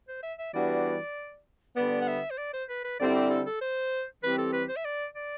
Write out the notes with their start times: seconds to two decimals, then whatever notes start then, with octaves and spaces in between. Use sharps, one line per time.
0.08 C5
0.23 E5
0.38 E5
0.53 E3 G3 B3 D4 F#4 D5
1.77 D3 G3 B3 D5
2.02 F#5
2.08 E5
2.31 C5
2.38 D5
2.53 C5
2.69 B4
2.84 B4
2.99 D3 G3 C4 E4 D5
3.15 G4
3.30 A4
3.46 A4
3.61 C5
4.23 E3 G3 C4 G4 B4
4.38 A4
4.53 B4
4.69 C5
4.76 E5
4.85 D5
5.15 D5